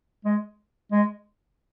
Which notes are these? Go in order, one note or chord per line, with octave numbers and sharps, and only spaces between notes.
G#3
G#3